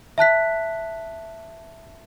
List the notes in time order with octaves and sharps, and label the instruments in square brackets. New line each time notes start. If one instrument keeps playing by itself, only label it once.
[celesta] E5 A5 F#6 B6